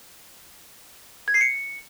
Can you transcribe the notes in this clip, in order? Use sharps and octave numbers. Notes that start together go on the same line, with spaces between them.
G#6
C7
C#7